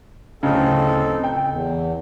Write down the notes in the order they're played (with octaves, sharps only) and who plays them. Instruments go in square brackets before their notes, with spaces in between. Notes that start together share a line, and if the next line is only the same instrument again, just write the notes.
[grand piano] D1 C#3 [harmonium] C4 D#4 A4
[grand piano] G5
[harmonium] E2